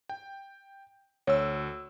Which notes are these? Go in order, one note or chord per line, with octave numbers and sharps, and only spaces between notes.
G5
D2 C#5 E6